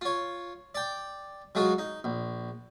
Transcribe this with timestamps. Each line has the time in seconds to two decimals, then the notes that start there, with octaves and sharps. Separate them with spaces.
0.01 F4 C#5
0.75 D5 G5
1.55 F#3 G#3 F4 F#4
1.78 D#4
2.04 A#1